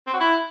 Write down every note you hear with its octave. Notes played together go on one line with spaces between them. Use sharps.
C4
F#4
E4